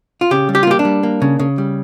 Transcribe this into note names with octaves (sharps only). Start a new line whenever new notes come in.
F4
C#3 G4
G3
G4
F4
A#3 G4
D4
G3
A#3
C#3
C#3
G3